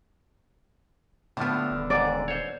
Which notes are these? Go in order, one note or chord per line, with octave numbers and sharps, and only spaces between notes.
A2 D3 F3 B3
D#1
D#2 G#2 D5
C5 C#5